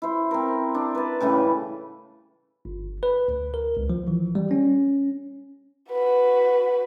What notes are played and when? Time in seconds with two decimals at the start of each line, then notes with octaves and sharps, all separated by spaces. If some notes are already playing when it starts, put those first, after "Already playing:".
0.02 E4 C5
0.31 C4 A#4
0.75 D4
0.95 B4 A5
1.21 A2 C#3 E3 G3
2.65 G1
3.03 B4
3.28 D2
3.54 A#4
3.77 C#2
3.90 F3
4.08 E3
4.35 G3
4.51 C#4
5.91 F#4 B4